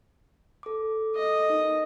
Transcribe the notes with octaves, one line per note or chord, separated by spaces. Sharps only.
A4 D6
D#5
D#4 A#4